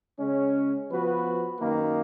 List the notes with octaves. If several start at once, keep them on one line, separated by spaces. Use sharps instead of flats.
C#3 G#3 C#4
F3 B3 F#4 B4
F#2 D#3 A#3